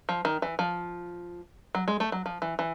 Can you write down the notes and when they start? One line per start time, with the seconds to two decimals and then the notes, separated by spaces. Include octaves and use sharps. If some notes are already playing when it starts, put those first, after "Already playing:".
0.09 F3
0.25 D#3
0.42 E3
0.59 F3
1.75 F#3
1.88 G#3
2.00 A3
2.12 F#3
2.26 F3
2.42 E3
2.59 E3